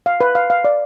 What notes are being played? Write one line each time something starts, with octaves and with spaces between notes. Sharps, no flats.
F5
B4
F5
F5
D5